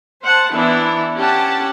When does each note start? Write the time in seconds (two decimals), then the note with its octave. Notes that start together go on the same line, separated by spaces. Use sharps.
0.23 C5 F#5 A5
0.52 E3 B3 D4 E4
1.16 C#4 G4 F#5 A5